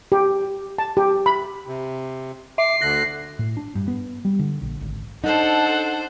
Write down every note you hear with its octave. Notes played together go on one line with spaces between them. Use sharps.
G4
A5
G4
B5
C3
E5 D6 C7
D2 D3 F#6 A#6
A2
D4
G2
B3
G3
D3
A#1
G#1
D4 D#4 A4 C5 F#5